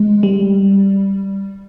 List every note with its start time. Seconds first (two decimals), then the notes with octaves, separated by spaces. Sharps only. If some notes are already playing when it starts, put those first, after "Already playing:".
Already playing: G#3
0.23 G3